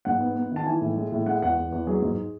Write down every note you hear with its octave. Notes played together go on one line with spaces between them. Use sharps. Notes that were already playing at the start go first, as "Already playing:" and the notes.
G#2 F#5
B3
B3
D#3 A5
E3 G#5
A2
G#3
A2
G#3 F#5
E2 F#5
E2
E2
F#3 G#4
G#2